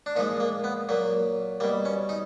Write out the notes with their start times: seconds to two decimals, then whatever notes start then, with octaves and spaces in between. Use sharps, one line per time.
0.06 D4
0.16 A#2 F3 G#3 D#4
0.40 A#3
0.64 B3
0.89 A#2 F#3 A#3
1.60 B2 G3 A#3
1.85 C#4
2.09 D#4